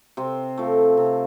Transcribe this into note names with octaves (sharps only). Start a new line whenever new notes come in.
C3 C4
F3 A3
C3